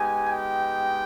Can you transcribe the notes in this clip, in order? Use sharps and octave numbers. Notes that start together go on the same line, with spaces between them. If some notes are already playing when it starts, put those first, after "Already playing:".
Already playing: G#3 B3 D#4 G4 G#5
G5